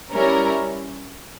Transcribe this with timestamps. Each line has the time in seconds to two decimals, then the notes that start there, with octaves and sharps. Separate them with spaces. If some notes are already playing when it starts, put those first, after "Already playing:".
0.12 G3 C#4 E4 A#4 C#5